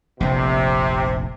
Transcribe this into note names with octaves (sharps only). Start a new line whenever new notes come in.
F1 A#1 C3